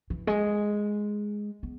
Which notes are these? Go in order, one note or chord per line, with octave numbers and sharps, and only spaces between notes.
E3
G#3
B3